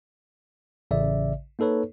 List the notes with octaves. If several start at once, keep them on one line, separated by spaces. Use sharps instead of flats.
A1 C#3 D5 E5
A#3 D#4 A4 B4 C#5